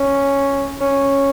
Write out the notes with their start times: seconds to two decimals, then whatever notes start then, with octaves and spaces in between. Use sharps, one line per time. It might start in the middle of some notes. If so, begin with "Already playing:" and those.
Already playing: C#4
0.81 C#4